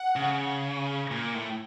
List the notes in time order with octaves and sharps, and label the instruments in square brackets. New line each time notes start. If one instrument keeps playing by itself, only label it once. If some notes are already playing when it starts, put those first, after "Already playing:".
Already playing: [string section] F#5
[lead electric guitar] C#3
A#2
A2